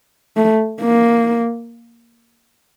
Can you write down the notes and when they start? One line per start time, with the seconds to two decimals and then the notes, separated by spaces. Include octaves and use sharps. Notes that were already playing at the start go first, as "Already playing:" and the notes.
0.37 A3
0.81 A#3